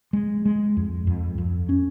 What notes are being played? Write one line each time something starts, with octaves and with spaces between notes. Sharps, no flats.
G#3
G#3
F2
F2
F2
C#4